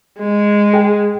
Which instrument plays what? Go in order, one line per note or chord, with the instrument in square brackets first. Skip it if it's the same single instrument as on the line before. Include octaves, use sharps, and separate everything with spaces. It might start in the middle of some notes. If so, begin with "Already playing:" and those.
[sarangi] G#3
[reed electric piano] G#4 G5